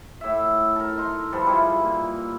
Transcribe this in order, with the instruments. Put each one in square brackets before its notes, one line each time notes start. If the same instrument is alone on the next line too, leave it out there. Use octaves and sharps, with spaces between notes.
[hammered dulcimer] A2 E5
A4 A#4
D#4 C6
F3 G3 A4 B4
G3 G#3 D#4 E4
A#2